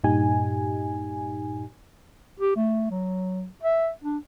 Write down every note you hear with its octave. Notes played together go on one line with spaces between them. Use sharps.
G2 A#2 D#4 G4 G#5
G4
A3
F#3
E5
D4